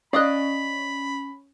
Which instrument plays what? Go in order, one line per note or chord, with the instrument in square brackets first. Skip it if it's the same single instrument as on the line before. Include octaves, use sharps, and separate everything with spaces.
[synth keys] C#4 [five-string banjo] D5 D#5 [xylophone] F5 D#6 F#6 [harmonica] B5